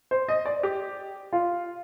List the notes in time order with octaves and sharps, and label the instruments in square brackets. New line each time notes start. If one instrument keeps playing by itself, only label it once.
[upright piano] C5
D#5
D5
G4
F4